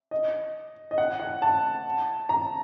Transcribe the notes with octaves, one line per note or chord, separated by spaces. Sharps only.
D#5
D#5
F#5
F#5
A5
A#5